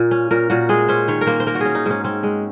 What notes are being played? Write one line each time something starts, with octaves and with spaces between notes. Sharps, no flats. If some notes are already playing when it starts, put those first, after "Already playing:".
Already playing: A#2 A#3
C#4
A#2 A#4
A#2 F#4
G#3 G#4
C#4 C5
D#3 C#5
A#4
A#3 C5
C5
A#3 A#4
F#4
C#4 G#4
D#4
G#2 C#4
C4 C#4
G#3